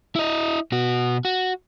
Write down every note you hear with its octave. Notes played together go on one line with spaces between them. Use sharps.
E4 D#5
B2 F#4
F#4